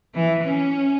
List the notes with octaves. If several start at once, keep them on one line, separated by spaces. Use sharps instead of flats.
E3
C#4